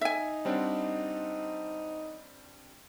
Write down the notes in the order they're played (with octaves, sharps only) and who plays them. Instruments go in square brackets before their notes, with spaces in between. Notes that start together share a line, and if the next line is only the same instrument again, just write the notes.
[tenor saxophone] D#4 [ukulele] E5 G#5
[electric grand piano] G3 C4 D4 [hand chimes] C5 C#5 F#5